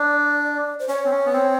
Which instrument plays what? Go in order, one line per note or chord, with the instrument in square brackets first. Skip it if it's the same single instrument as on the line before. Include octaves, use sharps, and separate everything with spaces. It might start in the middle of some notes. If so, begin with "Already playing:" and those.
Already playing: [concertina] D4 [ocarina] D5
[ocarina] C5
[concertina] C#4 [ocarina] C#5
[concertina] C4
C#4
B3
C4